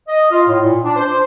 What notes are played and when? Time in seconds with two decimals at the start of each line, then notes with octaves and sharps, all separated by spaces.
0.08 D#5
0.31 F4
0.47 A2
0.60 A#2
0.83 D4
0.96 C5